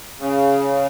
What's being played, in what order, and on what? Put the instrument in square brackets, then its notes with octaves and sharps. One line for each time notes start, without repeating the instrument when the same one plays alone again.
[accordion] C#3